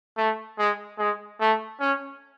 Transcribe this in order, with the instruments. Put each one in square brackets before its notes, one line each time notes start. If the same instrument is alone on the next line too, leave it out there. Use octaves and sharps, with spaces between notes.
[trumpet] A3
G#3
G#3
A3
C#4